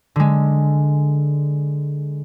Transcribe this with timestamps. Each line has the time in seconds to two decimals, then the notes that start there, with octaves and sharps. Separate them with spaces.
0.16 D3 G#3